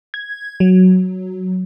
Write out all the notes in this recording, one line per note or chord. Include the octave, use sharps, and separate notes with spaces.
G#6
F#3